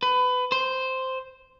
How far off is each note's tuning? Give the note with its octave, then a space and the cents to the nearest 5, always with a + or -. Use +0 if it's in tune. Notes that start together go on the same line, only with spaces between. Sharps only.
B4 +25
C5 -5